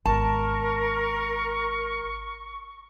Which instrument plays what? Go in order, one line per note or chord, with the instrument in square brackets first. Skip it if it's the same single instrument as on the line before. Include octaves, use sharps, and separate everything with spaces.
[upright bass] G#1 B3 [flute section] A#4 [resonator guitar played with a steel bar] A5 [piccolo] C#6